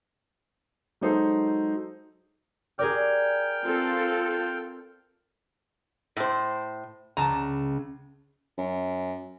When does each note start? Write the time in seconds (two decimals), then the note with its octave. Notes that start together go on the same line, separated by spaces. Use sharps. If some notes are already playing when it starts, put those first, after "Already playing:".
1.01 F#3 G#3 D#4 A4 C5
2.79 G#4 A#4 D5 G5 F6
3.64 C4 F4 A4
6.17 A2 C5
7.17 C#2 A5 A#5
8.58 F#2